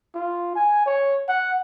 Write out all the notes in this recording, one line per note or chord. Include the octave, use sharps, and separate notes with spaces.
F4
G#5
C#5
F#5